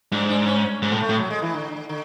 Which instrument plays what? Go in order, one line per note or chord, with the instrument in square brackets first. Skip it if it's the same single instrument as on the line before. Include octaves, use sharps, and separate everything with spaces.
[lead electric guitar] G#2 [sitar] D4
[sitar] D4
C#4
[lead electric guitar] G#2
A2
[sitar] A3
[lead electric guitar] A2
[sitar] F#3
G#3
E3
D3
D3